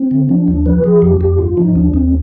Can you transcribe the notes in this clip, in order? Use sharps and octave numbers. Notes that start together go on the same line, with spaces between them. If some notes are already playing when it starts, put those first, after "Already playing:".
Already playing: C4
D3
F3 D4
D#2 D4
F3 B4
F3 G#4
F2 G4
F2 G4
G2 F4
F3 D#4
D#2 D4
D#2 C4